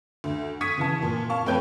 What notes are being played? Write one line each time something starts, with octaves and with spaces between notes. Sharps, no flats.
D2
C#6 D#6 G#6 B6 C#7 D#7
C#3 E3 A5
A#2
F5 A5 C#6
F2 A3 B4 C#5 G5 G6